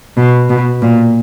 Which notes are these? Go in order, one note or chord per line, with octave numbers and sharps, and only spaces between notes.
B2
B2
A#2